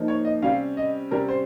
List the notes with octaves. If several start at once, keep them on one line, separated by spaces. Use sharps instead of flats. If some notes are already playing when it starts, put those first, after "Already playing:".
Already playing: F3 A#3 D#4
C#5
D#5
C3 G3 C#4 F5
D#5
C3 G3 C#4 A#4
C5